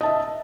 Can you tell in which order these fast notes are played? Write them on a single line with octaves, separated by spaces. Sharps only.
D#5 A5 E5